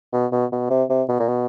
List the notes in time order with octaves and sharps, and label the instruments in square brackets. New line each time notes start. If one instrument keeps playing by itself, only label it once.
[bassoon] B2
B2
B2
C3
C3
B2
A#2
B2